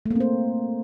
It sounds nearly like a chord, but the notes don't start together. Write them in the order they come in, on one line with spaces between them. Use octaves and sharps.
A3 A#3 C4 C5